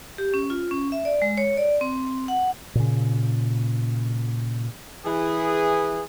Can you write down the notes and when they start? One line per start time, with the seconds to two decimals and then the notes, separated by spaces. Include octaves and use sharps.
0.18 G4
0.34 C#4
0.50 F4
0.71 C#4
0.92 E5
1.05 D5
1.22 G#3
1.37 C#5
1.57 D5
1.81 C4
2.28 F#5
2.75 A#2 C#3
5.05 E3 G#4